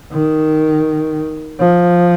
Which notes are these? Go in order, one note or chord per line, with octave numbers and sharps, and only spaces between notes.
D#3
F3